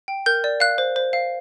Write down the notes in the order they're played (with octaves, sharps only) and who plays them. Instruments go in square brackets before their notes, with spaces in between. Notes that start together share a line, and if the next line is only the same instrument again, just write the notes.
[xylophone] G5
A#4 G6
D5
F5 F#6
C5
C5
F5